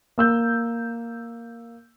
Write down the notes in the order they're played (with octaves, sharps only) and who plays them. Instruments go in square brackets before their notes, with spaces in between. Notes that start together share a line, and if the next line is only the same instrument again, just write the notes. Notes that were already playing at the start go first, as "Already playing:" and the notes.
[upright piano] A#3 E6 G6